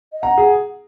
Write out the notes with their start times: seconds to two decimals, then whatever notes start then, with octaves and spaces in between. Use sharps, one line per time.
0.12 D#5
0.22 F#5 A#5
0.38 G#4